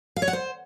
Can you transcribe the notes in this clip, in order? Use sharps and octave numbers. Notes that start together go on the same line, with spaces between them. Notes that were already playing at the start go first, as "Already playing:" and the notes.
F5
C#5
F#5
C5